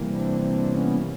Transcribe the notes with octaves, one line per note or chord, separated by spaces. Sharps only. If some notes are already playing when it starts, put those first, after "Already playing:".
Already playing: C3 E3 G3 A#3
C4 D4
C4 D4
B3 C#4